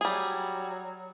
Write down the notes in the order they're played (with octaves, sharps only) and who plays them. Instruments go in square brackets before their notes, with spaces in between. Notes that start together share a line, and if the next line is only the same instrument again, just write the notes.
[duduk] F#3 [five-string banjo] G3 G#4